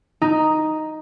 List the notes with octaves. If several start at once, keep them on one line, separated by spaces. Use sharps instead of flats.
D#4